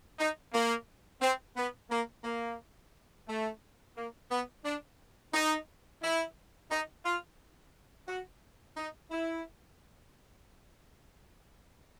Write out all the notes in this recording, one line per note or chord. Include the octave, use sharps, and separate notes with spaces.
D#4
A#3
C4
B3
A#3
A#3
A3
A#3
B3
D4
D#4
E4
D#4
F4
F#4
D#4
E4